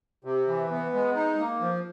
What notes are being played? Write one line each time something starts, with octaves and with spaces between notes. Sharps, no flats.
C3
E3
B3
G#3
D#4
A#3
F3